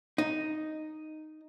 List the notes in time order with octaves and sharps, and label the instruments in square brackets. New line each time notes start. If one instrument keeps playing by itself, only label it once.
[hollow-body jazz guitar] D#4